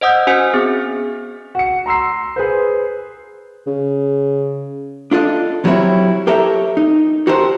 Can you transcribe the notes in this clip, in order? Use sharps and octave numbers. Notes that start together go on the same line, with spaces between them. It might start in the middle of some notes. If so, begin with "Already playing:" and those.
C5 D#5 F#5 D#6 E6 G6
C#4 F#4 C5 G#5 C#7
B3 C4 G#4
F#4 C#7
A#5 C6 E6 C7
G#4 B4 C5
C#3
D4 F4 A4 D#5
C2 F#3 G3 C4 E4 C#5
G4 A4 A#4 C#5 E5
D#4
F#4 G4 A4 A#4 C5